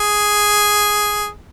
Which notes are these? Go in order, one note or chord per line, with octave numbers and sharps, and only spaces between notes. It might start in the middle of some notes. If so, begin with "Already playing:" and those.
Already playing: G#4